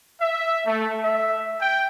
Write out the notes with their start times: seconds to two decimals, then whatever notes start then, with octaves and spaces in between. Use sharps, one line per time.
0.19 E5
0.65 A3
1.01 E5
1.59 G5